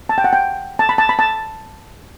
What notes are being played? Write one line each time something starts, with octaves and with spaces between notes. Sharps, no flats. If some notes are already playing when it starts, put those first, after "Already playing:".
A5
G5
F#5
G5
A5
B5
A5
B5
A5